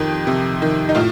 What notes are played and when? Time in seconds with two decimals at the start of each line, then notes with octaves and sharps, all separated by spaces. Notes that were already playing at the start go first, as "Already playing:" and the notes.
Already playing: F2 D#3 G4
0.27 C3
0.62 D#3
0.89 D#4
0.95 A2 F4